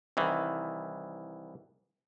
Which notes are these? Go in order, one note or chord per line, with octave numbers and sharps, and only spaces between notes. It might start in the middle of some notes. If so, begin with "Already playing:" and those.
C2 D#3 E3